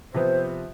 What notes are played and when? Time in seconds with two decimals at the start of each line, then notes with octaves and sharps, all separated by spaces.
0.14 C3 F3 B3 C5